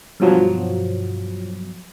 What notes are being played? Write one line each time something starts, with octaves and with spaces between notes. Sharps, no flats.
G2 B2 F3 F#3